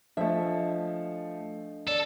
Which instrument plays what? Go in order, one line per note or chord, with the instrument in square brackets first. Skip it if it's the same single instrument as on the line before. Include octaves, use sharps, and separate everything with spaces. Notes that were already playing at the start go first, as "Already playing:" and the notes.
[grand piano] F3 A3 [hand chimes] D4 D#5 [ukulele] E5
[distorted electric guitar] A4 [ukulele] D5